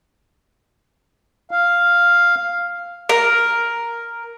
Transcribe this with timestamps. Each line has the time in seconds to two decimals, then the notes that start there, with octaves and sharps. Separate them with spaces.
1.51 F5
3.09 A#4